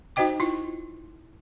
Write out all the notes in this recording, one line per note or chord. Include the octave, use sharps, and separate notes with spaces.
D#4 F#4 C5 D#5 G5 D6
E4 F4